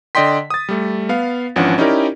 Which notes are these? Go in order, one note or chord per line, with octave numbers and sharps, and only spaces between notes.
D3 D5 D#5 G5 C6 B6
D#6 A6
G3 A3
B3 F5
G#1 E3 F3 C#4 D4 F#5
C#4 D#4 E4 G4 A#4 D5